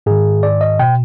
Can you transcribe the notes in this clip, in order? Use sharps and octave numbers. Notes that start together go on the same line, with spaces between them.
G#2 D#3 G#4
D5
D#5
B2 G5